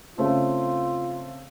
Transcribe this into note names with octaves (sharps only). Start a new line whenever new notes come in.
C#3 A3 C4 F4